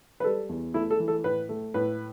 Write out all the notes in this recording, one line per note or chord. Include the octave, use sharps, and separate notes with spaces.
B4
G3 A4
E2
A3 E4
A4
E3
A4
A2 B4
A3
A2 B4